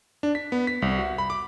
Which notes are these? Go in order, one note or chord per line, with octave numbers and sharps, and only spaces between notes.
D4
B6
B3
B6
C2
F#4
B5
D6